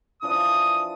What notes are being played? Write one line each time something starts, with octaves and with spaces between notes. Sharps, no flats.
E3 F3 D4 D#6